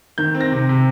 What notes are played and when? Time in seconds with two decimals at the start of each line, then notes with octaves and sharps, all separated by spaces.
0.18 D#3 G6
0.34 C4
0.41 A#6
0.51 C3
0.69 C3